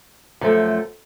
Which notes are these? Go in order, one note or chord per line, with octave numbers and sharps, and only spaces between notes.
F#2 F3 A3